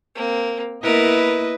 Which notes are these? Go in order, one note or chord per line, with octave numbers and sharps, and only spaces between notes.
A#3 C4
A#3 B3 E4 A#4 B4 D#5